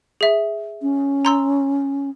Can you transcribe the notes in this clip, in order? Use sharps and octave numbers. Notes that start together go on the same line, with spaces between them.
G#4 E5
C#4
A#5 C6 E6